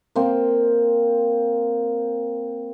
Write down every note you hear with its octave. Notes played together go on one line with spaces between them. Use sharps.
A#3 C4